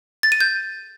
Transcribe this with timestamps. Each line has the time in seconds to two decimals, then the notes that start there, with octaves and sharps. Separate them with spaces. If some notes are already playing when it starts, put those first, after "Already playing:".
0.23 A6
0.32 D#7
0.41 G6